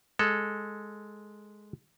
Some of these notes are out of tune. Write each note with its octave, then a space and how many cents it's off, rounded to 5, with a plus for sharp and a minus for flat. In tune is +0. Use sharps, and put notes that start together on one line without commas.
G#3 +0 A4 +0